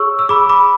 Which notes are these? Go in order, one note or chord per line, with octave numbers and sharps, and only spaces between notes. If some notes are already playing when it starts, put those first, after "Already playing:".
Already playing: G#4 C#5 C#6 E6
E6
G#4 B5 D6
B5 D6